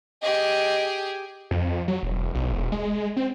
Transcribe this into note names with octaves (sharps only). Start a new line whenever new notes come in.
G4 G#4 D#5
F2
F#3
E1
B1
E1
G#3
C4